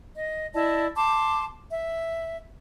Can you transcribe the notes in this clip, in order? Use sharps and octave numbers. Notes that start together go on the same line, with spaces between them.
D#5
E4 D5 D#5 A5
A5 C6 D6
E5